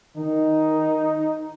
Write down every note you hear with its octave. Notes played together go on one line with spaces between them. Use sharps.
D#3 D#4